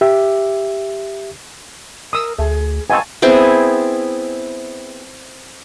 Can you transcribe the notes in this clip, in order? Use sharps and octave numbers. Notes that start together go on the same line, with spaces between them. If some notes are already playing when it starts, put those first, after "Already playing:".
G4 E5
A#4 D#6 E6
D2 A3 G#4
G#2 B2 C4 F5 G#5 A5 C#6
B3 C4 E4 G#4